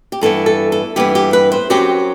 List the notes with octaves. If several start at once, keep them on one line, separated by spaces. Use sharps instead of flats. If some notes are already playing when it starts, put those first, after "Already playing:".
G4
G2 E3 B3 A4
A4
A4
G2 E3 B3 G4
G4
B4
C5
F#2 F#3 C4 G4